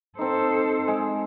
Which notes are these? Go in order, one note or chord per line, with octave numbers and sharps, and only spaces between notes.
C4 D#4 A4 C5
G#3